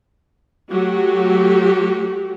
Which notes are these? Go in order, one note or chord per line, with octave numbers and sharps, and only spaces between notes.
F#3 A3 F#4 G4